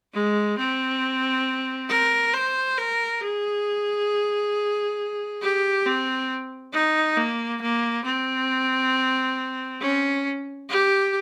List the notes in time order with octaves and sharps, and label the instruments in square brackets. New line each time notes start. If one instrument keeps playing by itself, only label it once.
[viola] G#3
C4
A#4
C5
A#4
G#4
G4
C4
D#4
A#3
A#3
C4
C#4
G4